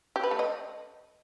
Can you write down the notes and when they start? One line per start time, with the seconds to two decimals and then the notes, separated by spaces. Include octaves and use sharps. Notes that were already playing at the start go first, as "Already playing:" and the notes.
0.16 G4
0.23 B4
0.31 A3
0.39 D#5